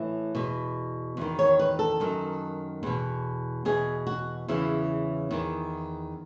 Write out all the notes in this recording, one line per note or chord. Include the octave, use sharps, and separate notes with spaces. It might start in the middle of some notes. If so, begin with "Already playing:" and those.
Already playing: A2 E3
E2 B2
E2 D#3
C#5
B4
A4
F#2 D#3
E2 B2
E2 B2 G#4
F#4
E2 C#3 E3 E4
E2 D#3